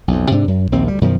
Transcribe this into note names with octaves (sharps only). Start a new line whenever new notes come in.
B1 F2
G#2 C3 C4 D4
F#2
A#1 D#2 C4
D2 G3
F#2 B2 D#3 F3